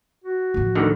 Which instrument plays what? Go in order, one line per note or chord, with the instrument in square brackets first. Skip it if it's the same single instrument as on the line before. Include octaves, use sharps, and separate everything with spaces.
[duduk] F#4
[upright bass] A1 F3
[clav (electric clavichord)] D2 D3 D#3